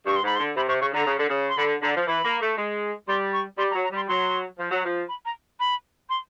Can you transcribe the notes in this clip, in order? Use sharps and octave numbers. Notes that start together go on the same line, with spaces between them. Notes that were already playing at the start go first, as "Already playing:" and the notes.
G2 C#6
C6
G#2 B5
C6
D3
C3 B5
C3 C#6
C#3 C#6
D3 A#5
C#3
D3
C#3
C6
D3 B5
D3 A#5
F3
E3 B5
A#3
A3
G#3
G3 C6
C#6
G3 C6
A#5
F#3
A#5
G3 C6
F#3 C6
F3
F#3
F3
B5
A#5
B5
C6